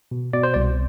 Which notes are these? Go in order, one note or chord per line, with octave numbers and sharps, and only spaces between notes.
B2
B2 D5
C5
C2 D5